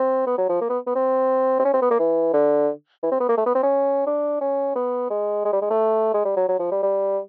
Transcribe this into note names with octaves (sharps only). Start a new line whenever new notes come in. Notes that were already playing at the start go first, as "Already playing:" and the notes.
Already playing: C4
B3
F#3
F3
A#3
B3
B3
C4
C4
C#4
C4
B3
A#3
E3
D3
E3
C4
B3
A#3
A3
B3
C4
C#4
D4
C#4
B3
G#3
G#3
G3
G#3
A3
G#3
G3
F#3
F#3
F3
G3
G3